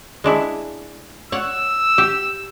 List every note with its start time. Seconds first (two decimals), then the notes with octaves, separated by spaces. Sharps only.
0.24 G#3 D4 E4
1.32 C#5 D5 F#5 E6
1.98 G4